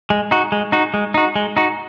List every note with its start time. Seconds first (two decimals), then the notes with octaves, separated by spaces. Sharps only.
0.10 G#3
0.31 D#4 F#4
0.52 G#3
0.72 D#4 F#4
0.94 G#3
1.14 D#4 F#4
1.36 G#3
1.57 D#4 F#4